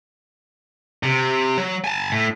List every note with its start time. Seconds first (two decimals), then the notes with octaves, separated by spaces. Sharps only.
1.03 C3
1.58 F#3
1.84 G#5 A5
2.12 A2